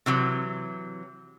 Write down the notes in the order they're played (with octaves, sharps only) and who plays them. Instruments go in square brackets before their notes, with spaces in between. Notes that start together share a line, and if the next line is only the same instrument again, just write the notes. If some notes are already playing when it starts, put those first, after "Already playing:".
[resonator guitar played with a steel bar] C3 E3 F#3